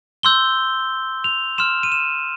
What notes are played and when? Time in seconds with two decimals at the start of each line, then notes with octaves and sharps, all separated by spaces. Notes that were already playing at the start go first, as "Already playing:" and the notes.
0.23 C6 E6 G6 G7
1.24 F7
1.58 C6 F6 E7
1.83 D#7
1.92 E7